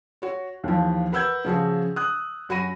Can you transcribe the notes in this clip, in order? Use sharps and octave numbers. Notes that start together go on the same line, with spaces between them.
F#4 C#5
D#2 E3 F3
A#4 B4 F#5 E6 G6 G#6
C#3 F3 F#4 G#4
D#6 F#6
F#2 F#4 B5 A#6 D#7